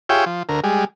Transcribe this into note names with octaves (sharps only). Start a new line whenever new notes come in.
F4 G4 G#4 C#5 E5 G5
F3
D2 A#4
G3 G#3